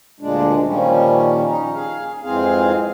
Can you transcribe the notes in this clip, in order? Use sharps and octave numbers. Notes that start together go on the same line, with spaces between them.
D2 A#2 G#3 D4
A#2 D#3 F3 G3 C#4
C#4 D#4
G#4 F5
F2 G#2 E3 C4 G#4 F5